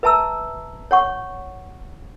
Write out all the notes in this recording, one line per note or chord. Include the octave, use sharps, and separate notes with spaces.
B4 E5 A5 A#5 E6
C#5 F#5 C#6